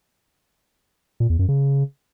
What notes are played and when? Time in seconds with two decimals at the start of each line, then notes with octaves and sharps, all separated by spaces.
1.20 A#2
1.30 E2
1.39 F#2
1.49 C#3